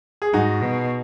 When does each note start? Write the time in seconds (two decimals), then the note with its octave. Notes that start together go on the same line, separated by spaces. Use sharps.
0.22 G#4
0.33 G#2 D#4 F#4
0.62 B2